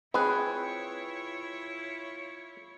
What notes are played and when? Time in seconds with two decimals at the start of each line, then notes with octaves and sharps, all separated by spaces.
0.14 C4 E4 F4 G#4 B4 C#5